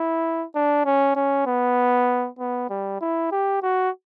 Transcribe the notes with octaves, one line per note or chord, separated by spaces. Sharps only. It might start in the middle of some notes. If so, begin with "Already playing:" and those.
Already playing: E4
D4
C#4
C#4
B3
B3
G3
E4
G4
F#4